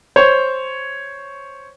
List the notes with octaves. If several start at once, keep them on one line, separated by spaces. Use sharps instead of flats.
C5 C#5